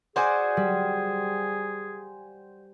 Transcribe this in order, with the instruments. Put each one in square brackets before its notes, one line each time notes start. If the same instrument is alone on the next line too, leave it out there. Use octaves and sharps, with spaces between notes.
[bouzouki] F#4 D5 F#5 [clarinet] G#4 [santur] C5 G#5
[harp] G3